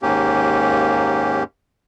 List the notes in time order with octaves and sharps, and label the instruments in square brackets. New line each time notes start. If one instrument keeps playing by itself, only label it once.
[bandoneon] D#2 G#2 A#3 C#4 G4